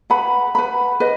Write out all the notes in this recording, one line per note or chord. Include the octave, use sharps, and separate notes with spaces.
B4 F#5 B5
B4 F#5 B5
B4 D#5